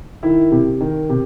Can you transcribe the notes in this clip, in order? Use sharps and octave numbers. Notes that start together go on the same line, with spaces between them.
D#3 E4
C3
D#3
C3